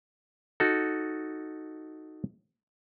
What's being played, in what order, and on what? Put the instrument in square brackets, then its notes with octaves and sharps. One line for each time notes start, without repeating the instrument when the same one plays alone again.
[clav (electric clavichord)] D#4 F#4 A4